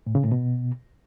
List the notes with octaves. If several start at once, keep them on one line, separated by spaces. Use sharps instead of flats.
A2
C#3
A2
B2